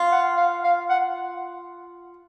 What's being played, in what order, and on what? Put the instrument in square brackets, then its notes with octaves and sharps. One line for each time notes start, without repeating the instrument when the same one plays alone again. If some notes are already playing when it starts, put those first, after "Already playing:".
Already playing: [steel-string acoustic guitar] F4
[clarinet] F#5
F5
F5
F#5